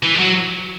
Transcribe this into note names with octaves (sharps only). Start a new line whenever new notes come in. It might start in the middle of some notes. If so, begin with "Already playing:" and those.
E3
G#3
F#3